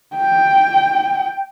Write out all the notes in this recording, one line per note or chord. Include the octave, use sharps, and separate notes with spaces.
G5